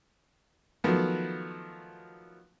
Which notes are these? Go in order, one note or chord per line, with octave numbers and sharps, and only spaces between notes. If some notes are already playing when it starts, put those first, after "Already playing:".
D#3 F3 F#3 A3 B3